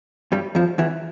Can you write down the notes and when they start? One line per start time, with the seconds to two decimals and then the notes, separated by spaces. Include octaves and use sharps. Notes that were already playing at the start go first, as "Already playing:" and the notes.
0.32 G2 G3
0.55 F2 F3
0.78 E2 E3